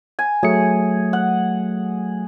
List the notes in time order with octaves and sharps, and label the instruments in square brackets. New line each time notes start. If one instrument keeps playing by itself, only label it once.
[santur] G#5
[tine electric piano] F#3 A3 C#7 [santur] G#4
[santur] F#5